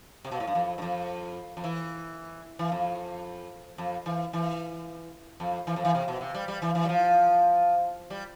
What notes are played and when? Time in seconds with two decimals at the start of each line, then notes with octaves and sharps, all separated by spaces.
0.25 C3
0.31 B2
0.40 A2
0.47 G2
0.55 F2
0.78 G2
0.82 F2
1.57 F2
1.64 E3
2.59 E3
2.72 F2
3.78 F2
4.06 E3
4.33 E3
5.40 F2
5.67 E3
5.76 F2
5.85 E3
5.95 C3
6.08 B2
6.21 C3
6.35 G3
6.48 G3
6.62 E3
6.75 E3
6.85 G3
6.89 F3
8.10 G3